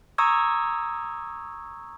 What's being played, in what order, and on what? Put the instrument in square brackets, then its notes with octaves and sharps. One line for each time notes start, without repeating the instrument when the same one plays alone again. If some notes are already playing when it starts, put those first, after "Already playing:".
[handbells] A#5 C#6 D#6 E6 G#6